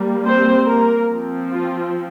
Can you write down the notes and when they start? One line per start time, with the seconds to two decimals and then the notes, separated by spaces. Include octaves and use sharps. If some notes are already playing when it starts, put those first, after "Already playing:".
Already playing: G3 A#3
0.25 C4 C5
0.67 A#3 A#4
1.09 F3 C4
1.51 F4